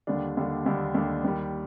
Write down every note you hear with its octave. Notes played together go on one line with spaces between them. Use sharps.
D#2 D3 G3 D4
D#2 D3 G3 D4
D#2 D3 G3 D4
D#2 D3 G3 D4
D#2 D#3 G3